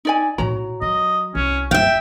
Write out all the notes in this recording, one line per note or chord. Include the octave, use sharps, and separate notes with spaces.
D#4 D5 G#5
A2 D#4 F#4 C#5 A#5
F#3 D#5
C2 C#4
F#1 E5 F5 G5